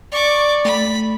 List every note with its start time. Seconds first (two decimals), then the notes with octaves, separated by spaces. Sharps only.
0.12 D5 C#6 D6
0.65 A3 B5